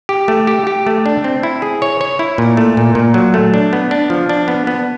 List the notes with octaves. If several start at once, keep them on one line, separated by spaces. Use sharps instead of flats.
G4
A3
G4
G4
A3
D4
C4
E4
G#4
C#5
C#5
E4
A#2
A3
A#2
A#2
F#3
A3
D4
B3
D4
F3
D4
B3
B3